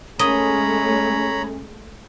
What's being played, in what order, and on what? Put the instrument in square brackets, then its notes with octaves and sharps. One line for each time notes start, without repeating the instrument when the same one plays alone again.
[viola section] G#3 A3 [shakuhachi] C#4 [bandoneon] C#5 A#5 B5 [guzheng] D#5